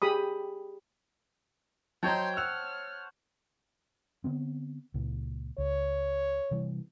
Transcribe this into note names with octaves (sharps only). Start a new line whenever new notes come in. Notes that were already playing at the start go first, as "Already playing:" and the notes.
G4 G#4 B5 D#6
F#3 C5 C#5 D#5 G5 A5 A#5 C6
F#5 E6 F6 F7
D3 B3 C4
C#2 A#2
C#2 C#5
C3 E3 G3